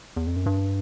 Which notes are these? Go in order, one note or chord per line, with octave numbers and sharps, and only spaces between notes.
E2
F2
F#2
G2